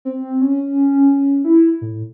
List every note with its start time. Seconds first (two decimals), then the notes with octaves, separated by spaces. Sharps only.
0.05 C4
0.41 C#4
1.44 E4
1.81 A2